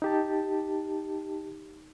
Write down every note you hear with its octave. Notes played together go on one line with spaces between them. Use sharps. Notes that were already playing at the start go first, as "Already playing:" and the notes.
D#4 G4 A5